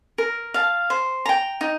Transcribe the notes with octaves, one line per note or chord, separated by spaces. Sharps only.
A#4
F5 A5
C5
G5 A#5
D#4